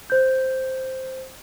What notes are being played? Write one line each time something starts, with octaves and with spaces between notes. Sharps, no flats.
C5 G6